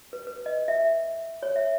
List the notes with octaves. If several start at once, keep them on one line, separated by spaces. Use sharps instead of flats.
B4
B4
D#5
E5
C#5
E5